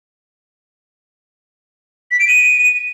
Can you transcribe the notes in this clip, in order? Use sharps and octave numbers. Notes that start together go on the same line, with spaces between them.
B6
D7
D#7